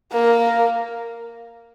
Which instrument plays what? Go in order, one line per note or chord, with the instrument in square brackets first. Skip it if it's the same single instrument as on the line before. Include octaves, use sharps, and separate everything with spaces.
[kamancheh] A#3